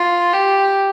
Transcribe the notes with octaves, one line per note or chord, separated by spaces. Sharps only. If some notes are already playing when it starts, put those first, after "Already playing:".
Already playing: F4
G4